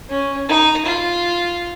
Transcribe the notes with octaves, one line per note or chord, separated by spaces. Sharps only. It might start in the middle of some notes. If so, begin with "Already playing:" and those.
C#4
D#4
F4